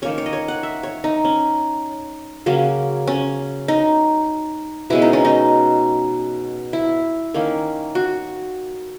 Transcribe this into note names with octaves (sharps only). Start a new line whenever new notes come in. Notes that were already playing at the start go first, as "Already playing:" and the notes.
D#3 A#3 C#4 C#5
C#5
D#5
C#5
F#5
E5
C#5
D#4
C#4
C#3 F#3 A#3 C#4
C#4
D#4
B2 G#3 C#4 E4
D#4
C#4
D#4
E4
D#3 A#3 C#4
F#4